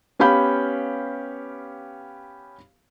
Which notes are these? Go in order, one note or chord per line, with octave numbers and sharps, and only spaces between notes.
B3 C#4 G4 F5 B5 G6